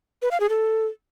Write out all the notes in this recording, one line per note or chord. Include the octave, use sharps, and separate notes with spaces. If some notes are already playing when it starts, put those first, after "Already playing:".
B4
F5
G#4
A4